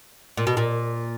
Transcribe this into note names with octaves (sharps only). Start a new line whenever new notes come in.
A#2
B2
A#2